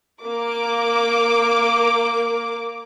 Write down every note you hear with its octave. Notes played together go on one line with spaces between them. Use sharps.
A#3 D6